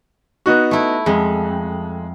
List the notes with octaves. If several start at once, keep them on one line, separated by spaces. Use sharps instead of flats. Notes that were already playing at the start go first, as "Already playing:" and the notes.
B3 D#4 F#4
A3 E4
F2 G#3